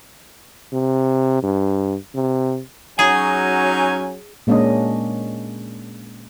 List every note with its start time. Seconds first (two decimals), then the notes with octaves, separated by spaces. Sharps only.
0.73 C3
1.43 G2
2.15 C3
2.99 F#3 C#4 D#4 F#4 G#4 G#5
4.47 A#2 G#3 A#3 C#4 D4 D#5